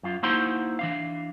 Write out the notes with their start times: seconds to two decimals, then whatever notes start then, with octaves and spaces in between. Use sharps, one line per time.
0.03 F#2 F4
0.23 A#3 D#4 E4 F#4 C5 C6
0.79 E3 D4 F5